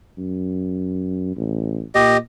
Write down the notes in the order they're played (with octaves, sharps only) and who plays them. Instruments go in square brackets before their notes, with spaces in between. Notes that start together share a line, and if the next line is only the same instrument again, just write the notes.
[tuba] F#2
A1
[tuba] A#2 [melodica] G4 D#5